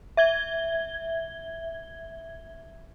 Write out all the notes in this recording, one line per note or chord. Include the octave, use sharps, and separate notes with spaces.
E5 G#6 G7